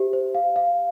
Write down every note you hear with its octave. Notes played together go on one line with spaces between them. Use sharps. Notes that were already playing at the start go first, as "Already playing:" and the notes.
Already playing: G4 C5 E5
C5
F5
F5